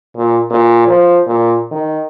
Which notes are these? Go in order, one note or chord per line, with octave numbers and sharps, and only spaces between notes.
A#2
A#2
F3
A#2
D#3